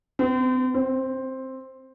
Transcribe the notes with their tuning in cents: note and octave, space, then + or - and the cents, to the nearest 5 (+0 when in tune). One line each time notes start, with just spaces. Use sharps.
C4 -40
C4 +5